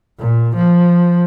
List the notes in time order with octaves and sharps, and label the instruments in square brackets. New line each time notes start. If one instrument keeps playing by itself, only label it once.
[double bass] A#2
F3